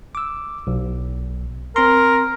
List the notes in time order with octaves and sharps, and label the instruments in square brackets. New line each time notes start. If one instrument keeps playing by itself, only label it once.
[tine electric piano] D6 E6
B1
[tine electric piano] C4 C6 [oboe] A#4